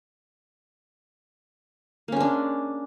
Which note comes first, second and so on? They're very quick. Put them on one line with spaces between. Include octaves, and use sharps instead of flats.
A#3 C#4 G#3 D4